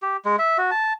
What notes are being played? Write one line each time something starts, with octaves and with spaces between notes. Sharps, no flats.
G4
G#3
E5
F#4
A5